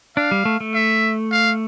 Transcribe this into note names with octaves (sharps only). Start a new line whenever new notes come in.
D4 F5
G3
A3
A3
E5
F5